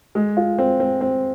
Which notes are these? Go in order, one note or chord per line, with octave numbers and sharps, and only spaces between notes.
G#3
F4
C4
C4
C4